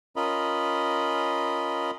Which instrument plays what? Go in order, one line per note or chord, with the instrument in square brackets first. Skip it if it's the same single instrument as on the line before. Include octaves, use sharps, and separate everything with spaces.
[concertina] C#4 F4 A#4 D#5 B5